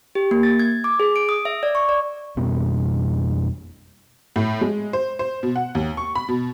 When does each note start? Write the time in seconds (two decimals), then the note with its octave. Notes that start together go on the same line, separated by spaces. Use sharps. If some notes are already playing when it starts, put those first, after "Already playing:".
0.15 G4
0.31 A#3
0.43 A6
0.59 G#6
0.84 D6
1.00 G#4
1.16 D7
1.29 D#6
1.45 E5
1.63 D5
1.75 C#6
1.89 D5
2.37 F2 B2 G3 B3
4.36 A2
4.61 G#3
4.93 C5
5.19 C5
5.43 B2
5.56 F#5
5.75 D#2
5.97 C#6
6.15 B5
6.29 B2